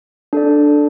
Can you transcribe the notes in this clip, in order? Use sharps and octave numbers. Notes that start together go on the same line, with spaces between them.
D4 A4 D5